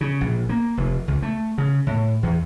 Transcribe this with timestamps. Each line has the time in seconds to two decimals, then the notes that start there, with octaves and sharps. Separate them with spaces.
0.01 C#3
0.21 A#1
0.49 A#3
0.77 F1
1.08 C#2
1.22 A3
1.58 C#3
1.87 A2
2.23 E2